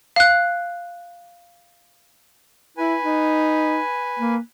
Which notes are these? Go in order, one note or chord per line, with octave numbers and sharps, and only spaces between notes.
F5 F#6
E4 B4 G#5
D#4
A#3